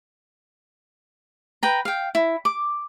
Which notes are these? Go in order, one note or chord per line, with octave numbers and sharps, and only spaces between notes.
B4 G5 A#5
F5 G5
E4
D6